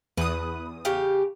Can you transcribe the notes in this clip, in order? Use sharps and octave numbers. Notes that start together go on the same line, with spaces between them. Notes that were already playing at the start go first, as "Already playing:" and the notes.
E2 B4 D#6
C#3 G4 F5